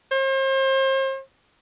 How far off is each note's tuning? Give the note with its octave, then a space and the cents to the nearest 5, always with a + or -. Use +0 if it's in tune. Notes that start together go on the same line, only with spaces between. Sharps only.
C5 +40